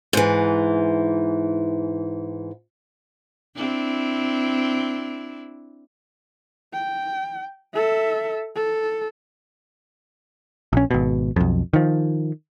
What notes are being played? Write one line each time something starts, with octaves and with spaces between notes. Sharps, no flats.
G#2 E3
C4 D4 E4
G5
A4 E5
A4
A#1 C#4
G#1 B2
B1 F2
D#3 F3